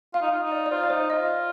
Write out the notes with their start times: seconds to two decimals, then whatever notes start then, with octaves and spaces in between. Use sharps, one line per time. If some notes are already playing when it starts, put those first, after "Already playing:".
0.14 F4 F5
0.22 D#4
0.31 F4
0.43 D#4
0.52 D5
0.66 D5
0.71 F4 C5
0.83 D5
0.90 D#4 C5
1.10 F4 D#5